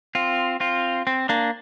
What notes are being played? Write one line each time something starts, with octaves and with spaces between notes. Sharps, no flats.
C4 F4
C4 F4
C4
A#3 D4